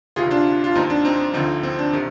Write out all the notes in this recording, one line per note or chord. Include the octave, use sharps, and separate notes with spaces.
D2 C3 D#3 F4 G#4
D4 F4
F4
D#2 D#3 C4 D#4
D4
C4 D#4
D2 D3 F3 C4 D#4
C4
D4
C3 D#3